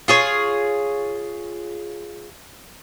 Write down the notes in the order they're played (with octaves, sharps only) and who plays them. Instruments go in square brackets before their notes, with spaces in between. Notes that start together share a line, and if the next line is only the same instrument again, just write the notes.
[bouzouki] F4 G#4 C#5